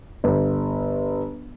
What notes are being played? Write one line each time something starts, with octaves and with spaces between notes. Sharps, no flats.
G1